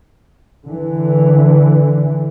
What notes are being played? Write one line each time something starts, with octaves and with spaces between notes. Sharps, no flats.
D3 E3